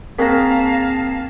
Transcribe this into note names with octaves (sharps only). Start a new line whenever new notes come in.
A#3 C4 G#4 F5 A5 A#5 B6